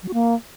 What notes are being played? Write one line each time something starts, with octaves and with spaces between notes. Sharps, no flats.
F#3
F#4
A#3